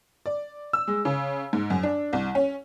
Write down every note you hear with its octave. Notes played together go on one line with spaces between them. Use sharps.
D5
E6
G#3
C#3
G#2
F#2
D4
C2
C#4